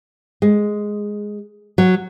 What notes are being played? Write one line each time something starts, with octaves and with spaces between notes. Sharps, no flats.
G#3
F#3